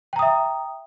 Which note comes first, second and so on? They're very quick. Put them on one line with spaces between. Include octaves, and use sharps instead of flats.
G5 A#5 D#6 E5